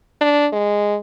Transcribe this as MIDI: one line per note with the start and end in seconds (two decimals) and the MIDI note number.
0.21 0.47 62
0.53 0.97 56